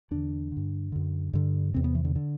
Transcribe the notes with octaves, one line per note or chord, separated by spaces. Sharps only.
E2 D3 D4
G2 D3
F#2 D3
G2 D3
E2 C3 C4
B3
E3
D3
D3